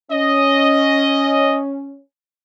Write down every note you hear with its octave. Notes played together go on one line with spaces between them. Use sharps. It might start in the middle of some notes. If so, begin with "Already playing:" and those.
C#4 D#5